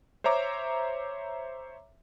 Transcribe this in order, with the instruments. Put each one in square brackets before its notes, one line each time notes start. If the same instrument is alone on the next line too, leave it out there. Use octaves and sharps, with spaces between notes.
[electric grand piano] C5 C#5 E5 A#5 D6